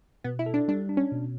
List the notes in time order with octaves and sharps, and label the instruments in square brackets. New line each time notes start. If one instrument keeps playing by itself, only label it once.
[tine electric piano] B2 [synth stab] B3
[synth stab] E4
[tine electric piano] A4
[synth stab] D4
[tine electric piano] G3 [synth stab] D4
[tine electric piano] D4
[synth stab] C#4
[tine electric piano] B2